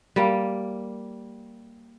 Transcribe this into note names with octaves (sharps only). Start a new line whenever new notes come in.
G3 A#3